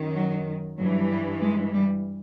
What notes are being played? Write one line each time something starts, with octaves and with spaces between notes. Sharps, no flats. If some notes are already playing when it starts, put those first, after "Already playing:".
Already playing: F#2 D#3
F#3
G2 E3 F#3
G3
G#3
G3